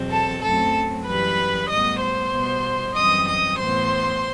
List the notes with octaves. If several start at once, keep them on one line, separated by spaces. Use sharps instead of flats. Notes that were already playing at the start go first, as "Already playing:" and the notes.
Already playing: E2 B2 F#3 C4
A4 A5
F#2 F#3 A3 C4 A4 A5
F#2 E3 G3 B4 B5
A2 G3 B3 D#5 D#6
C5 C6
B2 G3 B3
F#2 E3 G3 C4 D#5 D#6
D#5 D#6
A2 E3 B3 C5 C6